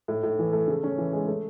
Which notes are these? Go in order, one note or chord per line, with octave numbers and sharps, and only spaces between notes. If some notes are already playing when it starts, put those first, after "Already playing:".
A2
A2
E3
A3
C#3
C#4
E3
G#3
A3